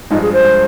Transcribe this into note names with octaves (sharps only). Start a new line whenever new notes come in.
G2 F3 G#3 D#4
G#4
C5
F3 G#3